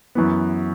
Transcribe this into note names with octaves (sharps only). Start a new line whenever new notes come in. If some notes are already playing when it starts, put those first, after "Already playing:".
F#2 E3 B3